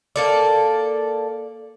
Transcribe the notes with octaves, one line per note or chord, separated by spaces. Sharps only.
A#3 A4 D5